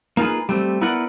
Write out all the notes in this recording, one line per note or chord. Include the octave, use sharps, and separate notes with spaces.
A#3 D#4 F4 G#4 B4
G3 A3 C4
B3 E4 A#4 B4 D5 F#5